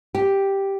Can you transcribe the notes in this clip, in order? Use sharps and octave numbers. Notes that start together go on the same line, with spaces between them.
G4